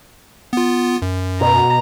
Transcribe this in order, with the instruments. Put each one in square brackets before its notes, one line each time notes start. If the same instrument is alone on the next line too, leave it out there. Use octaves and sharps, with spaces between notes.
[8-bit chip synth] B3 F4
F#2
[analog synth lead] B2 [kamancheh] A#5